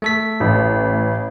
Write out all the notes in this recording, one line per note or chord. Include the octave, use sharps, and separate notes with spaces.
A3 A4 B6
A1